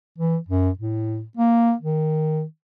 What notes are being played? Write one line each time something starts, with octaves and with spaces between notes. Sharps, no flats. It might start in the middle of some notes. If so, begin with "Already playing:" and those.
E3
F#2
A2
A#3
D#3